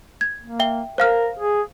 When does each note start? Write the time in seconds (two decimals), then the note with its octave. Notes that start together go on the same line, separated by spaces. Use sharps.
0.21 G#6
0.44 A#3
0.60 E5 G5 G7
0.98 A#4 C5 F5 F6
1.40 G#4